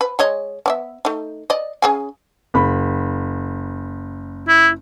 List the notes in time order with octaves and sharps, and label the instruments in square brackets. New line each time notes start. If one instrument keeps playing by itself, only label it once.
[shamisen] B4
G#3 C#5 D#5
B3 D5 E5
A3 D#4
D5 D#5
C#3 G#4 G#5
[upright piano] F#1 B5
[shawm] E4